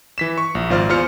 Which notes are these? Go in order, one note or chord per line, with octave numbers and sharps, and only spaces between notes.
E3 B6 E7
C#6
A#1
G#1 F4 C5 D5 F6
E2 F4 C5 F6 C#7